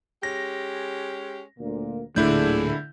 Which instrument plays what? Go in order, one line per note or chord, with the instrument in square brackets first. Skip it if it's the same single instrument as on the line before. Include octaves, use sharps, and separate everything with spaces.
[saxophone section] G#3 C#4 G4 [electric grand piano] A#6
[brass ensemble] D2 A#2 A#3
[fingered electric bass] D1 A3 [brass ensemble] A#2 G#4 [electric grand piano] D3 E4 G6 [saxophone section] D4